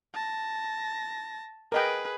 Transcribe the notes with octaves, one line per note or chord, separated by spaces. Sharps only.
A5 A#6
G#4 A#4 B4 D#5 G5